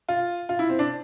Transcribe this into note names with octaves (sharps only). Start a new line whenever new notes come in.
F4
F4
E4
C4
D4